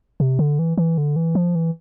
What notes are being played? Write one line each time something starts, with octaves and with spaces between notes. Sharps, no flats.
C3
D3
E3
E3
D3
E3
F3
E3